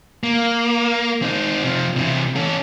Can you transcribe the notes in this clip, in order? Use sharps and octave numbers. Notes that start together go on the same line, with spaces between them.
A#3
C4 D#4
C3 F3
C3 E3
C#4 A4